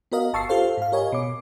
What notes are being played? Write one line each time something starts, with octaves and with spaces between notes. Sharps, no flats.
B3 F#4 A#4 D#5 F5
G1 A5 C#6 E6 A6 C7
F4 G4 A4 C5 F5
G#2 F5
G4 A#4 C#5 D#5 G#5
B2 D6